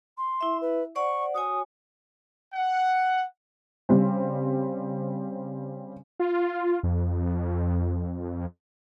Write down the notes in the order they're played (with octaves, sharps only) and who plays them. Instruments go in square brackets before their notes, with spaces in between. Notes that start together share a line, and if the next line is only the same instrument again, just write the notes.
[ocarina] C6
[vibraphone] E4 E5
[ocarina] B4
[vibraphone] C5 D5 F#5 [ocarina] C#6
[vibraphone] F#4 C#5 G#5 [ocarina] D#6
[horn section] F#5
[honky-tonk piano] C#3 G3 C4
[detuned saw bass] F4
F2